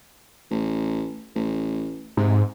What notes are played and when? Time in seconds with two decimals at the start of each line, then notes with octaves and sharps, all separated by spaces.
0.51 A1
1.35 A1
2.17 G#2 C3